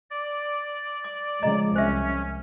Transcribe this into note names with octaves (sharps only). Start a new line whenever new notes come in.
D5
D6
C#3 F3 G#3 D#5 A#5
C2 C#4 C5 E5